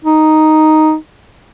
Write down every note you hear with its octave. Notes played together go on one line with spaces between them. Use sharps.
D#4